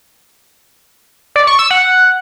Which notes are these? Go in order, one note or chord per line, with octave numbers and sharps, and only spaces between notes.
D5
C#6
E6
F#5